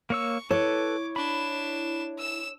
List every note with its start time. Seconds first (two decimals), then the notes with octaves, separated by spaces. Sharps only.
0.10 A#3 C#5 C#6 E6
0.51 E4 A4 B4 C#5 D6
1.16 D4 B5 E7
2.19 E6 E7